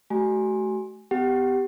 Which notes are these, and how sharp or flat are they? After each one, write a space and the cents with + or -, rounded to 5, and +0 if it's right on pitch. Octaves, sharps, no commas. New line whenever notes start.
A3 -30 F#4 +40 G#5 -5
B3 +30 G4 +0 F#5 +35